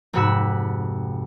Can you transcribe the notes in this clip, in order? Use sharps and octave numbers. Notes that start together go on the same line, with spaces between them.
F1 G#2 C3 F#4 B5 E6